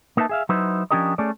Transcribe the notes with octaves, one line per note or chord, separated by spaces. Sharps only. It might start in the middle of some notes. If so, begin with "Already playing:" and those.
A#3 D#4 B4 E5 A5
G#4 E5 F5
F#3 D#4 E4 B4 C5
F3 C#4 D4 G4 A#4 D#5
A3 C#4 G#4 D5